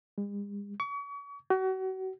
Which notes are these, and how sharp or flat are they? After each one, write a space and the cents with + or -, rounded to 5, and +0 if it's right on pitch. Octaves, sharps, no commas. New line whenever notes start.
G#3 -45
C#6 +40
F#4 +35